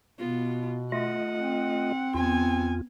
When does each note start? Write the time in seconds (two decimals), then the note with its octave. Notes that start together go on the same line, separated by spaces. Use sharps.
0.19 B2 B3 F4
0.92 A3 F4 D#5 F#5
1.39 C4
2.14 E2 B3 F4 G#5